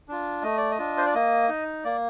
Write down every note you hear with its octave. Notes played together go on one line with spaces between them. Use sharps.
D4 F4
A3 D#5
D5
D#5
D4 F4
C5
D5
A#3 D#5
D#4
A#3 D5